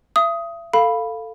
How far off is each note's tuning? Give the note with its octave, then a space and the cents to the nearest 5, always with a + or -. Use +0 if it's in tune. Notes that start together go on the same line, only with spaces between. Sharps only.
E5 +40 D#6 +10
A4 +15 F5 +0 B5 +0